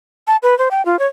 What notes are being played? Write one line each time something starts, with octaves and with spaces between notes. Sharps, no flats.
A5
B4
C5
G5
F4
C#5